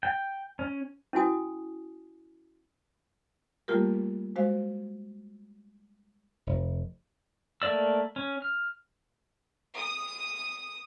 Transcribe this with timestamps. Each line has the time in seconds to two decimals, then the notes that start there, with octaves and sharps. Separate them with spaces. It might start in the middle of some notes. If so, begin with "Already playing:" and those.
0.03 G5
0.59 C#4
1.13 C#4 E4 F#4 G#5 D#6
3.68 G3 A3 A#3 F4 G4 A#4
4.36 G#3 F#4 C5 F5
6.47 F1
7.62 A3 A#3 D5 E6
8.16 C#4
8.42 F6
9.77 D#6